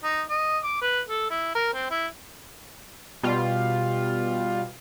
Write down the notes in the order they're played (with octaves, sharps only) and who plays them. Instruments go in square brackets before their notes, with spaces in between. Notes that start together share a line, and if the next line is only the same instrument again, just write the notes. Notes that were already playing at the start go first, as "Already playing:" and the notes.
[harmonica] D#4
D#5
D6
B4
A4
E4
A#4
C4
E4
[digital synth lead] B2 [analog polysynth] G3 F4